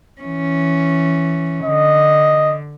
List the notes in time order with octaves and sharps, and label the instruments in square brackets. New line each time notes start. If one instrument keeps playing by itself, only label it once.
[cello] E3 C#4
[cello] D3 [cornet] D#5